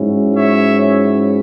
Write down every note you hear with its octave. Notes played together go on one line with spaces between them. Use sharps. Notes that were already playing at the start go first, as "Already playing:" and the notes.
Already playing: G#2 F#3 C#4 E4
C#5 E5